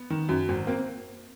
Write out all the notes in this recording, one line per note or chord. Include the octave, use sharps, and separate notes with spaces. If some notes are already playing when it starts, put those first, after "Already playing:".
Already playing: B3
D#3
F#2
G#1
A#3 C4